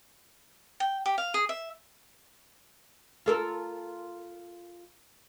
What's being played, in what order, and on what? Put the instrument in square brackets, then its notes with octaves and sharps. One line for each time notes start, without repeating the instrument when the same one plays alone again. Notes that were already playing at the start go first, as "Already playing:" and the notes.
[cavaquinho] G5
G4
F5
G#4
E5
[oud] F4 A4 A#4